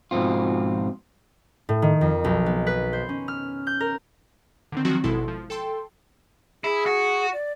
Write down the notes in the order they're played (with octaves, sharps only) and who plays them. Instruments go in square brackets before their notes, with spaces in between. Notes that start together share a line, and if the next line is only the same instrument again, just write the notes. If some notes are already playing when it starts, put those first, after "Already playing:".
[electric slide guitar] G#2 B2 F3 C4 F4
[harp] A2
D#3
F2
B1
B3
B4
C5
C#4
F6
G6
A#4
[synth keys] D3 D#3 C4
D#3 F3 F#3 C4 F#4
G#1 B2 G#3 E4 A4 C6
F3
A4 G5 C6
[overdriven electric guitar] E4 [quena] G#4
[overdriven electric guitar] F#4
[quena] D5